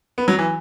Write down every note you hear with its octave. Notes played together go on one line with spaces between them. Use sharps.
B3
F#3
E3